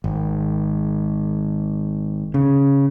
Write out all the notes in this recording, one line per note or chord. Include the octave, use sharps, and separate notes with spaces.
G#1
C#3